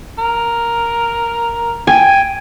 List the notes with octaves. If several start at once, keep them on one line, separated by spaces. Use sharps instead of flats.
A#4
G5 G#5